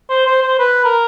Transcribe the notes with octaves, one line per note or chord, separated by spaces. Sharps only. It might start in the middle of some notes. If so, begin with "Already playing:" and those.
C5
C5
C5
B4
A#4